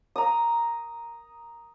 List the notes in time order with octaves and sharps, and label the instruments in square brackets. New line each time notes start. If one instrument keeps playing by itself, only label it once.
[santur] A#5 D#6